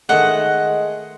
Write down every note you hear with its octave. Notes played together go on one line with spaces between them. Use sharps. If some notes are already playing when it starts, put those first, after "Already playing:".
D#3 G#3 A3 D#5 F#5